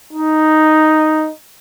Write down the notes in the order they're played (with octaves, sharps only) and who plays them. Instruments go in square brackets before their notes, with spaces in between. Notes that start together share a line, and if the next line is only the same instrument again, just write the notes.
[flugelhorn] D#4